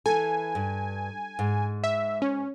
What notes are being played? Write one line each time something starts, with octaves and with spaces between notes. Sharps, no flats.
E3 A4 G#5
G2
G#2
E5
C#4